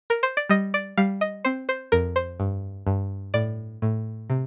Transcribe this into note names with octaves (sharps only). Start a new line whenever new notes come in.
A#4
C5
D5
G3 D#5
D5
G3 F5
D#5
C4 C5
C5
F2 A#4
C5
G2
G2
A2 D5
A2
C3